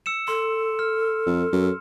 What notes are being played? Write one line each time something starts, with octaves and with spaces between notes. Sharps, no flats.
E6 C#7 E7
A4 C6
F6
F2
F#2